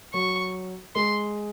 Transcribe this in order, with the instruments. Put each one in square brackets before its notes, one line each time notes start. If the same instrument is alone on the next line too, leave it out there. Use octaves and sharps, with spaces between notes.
[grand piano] F#3 [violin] C#6
[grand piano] G#3 [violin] C6